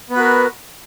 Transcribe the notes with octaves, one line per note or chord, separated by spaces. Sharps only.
B3 F#4 A#4 B4